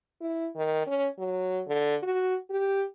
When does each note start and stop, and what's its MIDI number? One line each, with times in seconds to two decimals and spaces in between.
0.21 0.47 64
0.56 0.87 51
0.87 1.07 61
1.18 1.62 54
1.67 1.96 50
2.03 2.35 66
2.50 2.84 67